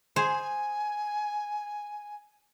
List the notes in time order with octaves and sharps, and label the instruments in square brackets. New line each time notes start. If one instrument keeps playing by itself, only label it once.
[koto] G#4 C5 [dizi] G#5